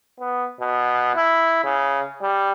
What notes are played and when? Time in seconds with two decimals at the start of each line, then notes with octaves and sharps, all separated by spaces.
0.20 B3
0.61 B2
1.15 E4
1.64 C#3
2.22 G3